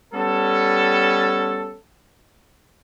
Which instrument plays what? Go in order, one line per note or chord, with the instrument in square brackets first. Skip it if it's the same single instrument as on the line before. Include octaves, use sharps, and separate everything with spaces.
[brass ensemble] G3 B3 C#4 A4